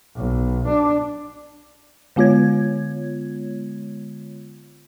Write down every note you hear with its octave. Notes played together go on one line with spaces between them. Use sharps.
B1
D4
D3 G#3 B3 F4 C#5 G#6